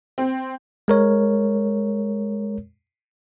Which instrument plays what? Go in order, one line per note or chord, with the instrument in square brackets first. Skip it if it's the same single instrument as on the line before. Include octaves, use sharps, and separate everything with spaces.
[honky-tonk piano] C4
[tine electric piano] G#3 A#4 C#5